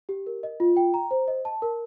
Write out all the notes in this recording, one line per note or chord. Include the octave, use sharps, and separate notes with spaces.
G4
A#4
D#5
F4
G5
A#5
C5
D#5
A5
A#4